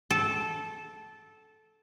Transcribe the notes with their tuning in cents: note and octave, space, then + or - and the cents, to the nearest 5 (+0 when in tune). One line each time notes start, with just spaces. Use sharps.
A4 -15